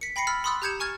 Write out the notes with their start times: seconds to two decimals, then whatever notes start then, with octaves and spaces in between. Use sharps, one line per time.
0.01 B6 C#7
0.16 G5 B5 A#6 C7 C#7
0.27 B5 E6 F6 A6 B6
0.44 B5 C6 D#6 E6 F#6 A6
0.62 G4 A#5 G6 G#6 C#7 E7
0.80 G#5 C#6 F6 G#6 A6